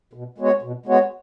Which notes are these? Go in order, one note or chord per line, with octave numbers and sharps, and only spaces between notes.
B2
G#3 B3 F#4 C#5
B2
G#3 B3 F#4 C#5